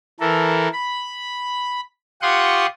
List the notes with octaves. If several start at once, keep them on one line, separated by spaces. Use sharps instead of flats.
E3 A4 A#4
B5
F4 G4 F#5 C6 C#6 D#6